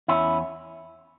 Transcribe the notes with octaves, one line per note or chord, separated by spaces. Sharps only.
E2 C#4 E4